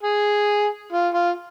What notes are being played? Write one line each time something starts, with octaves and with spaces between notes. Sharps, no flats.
G#4
F4
F4